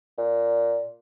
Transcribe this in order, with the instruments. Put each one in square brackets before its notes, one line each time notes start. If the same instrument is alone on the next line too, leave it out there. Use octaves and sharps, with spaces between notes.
[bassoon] A#2